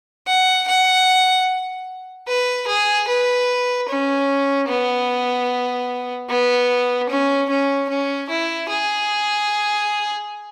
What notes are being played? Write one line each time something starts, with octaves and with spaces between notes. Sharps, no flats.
F#5
F#5
B4
G#4
B4
C#4
B3
B3
C#4
C#4
C#4
E4
G#4